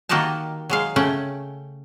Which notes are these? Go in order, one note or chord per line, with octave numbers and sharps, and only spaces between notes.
D#3 A#3 F#4 G4 D#5 A5
F#3 G#3 F5
C#3 A3 C#4 F#5 G5